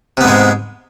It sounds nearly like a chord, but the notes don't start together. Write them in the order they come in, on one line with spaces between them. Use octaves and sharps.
C3 B3 G#2 G#3